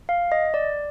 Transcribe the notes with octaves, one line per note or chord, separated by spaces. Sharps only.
F5
D#5
D5